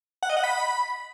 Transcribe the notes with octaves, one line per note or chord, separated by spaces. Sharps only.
F#5
D#5
F#5
B5